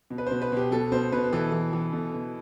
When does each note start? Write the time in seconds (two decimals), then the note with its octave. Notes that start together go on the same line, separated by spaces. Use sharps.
0.10 B2
0.18 B4
0.27 B2 C5
0.42 B4
0.52 B2 G4
0.71 B2 A4
0.92 B2 C5
1.12 B2 B4
1.33 E3 A4
1.52 E3
1.73 E3
1.93 B2 A4
2.14 B2